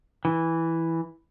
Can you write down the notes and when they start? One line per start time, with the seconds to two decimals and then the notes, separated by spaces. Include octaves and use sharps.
0.25 E3